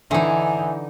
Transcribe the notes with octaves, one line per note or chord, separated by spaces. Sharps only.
D3 E3 D#4 E5 G#5